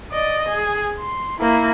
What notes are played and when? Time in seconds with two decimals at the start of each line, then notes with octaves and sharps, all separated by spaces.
0.12 D5 D#5
0.49 G#4
0.99 C6
1.41 A#3 E4